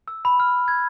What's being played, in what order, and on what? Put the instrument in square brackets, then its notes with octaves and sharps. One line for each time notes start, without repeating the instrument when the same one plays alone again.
[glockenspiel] E6
B5
F6
G#6